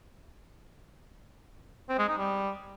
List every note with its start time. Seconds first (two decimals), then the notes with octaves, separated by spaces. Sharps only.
1.89 C4
1.98 G#3
2.08 D#4
2.18 G3